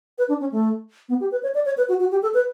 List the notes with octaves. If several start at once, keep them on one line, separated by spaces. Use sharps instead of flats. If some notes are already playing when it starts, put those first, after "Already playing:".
B4
D4
C#4
A3
B3
G4
B4
C#5
D5
C#5
B4
F#4
F#4
G4
A4
B4